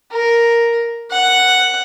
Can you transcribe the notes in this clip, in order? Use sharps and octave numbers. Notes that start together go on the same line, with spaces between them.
A#4
F#5